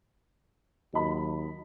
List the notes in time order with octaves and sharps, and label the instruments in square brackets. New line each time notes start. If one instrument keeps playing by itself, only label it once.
[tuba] D#2 [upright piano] F#3 D#5 B5